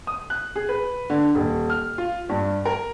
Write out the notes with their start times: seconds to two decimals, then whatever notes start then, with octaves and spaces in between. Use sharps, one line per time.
0.07 D#6
0.30 F#6
0.56 G#4
0.69 B4
1.10 D3
1.35 D#1
1.70 F6
1.98 F4
2.29 G2
2.65 A#4